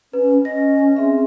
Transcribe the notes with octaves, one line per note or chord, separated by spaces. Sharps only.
C#4 B4
C#4 D#5 A#6
C4 G#4 E5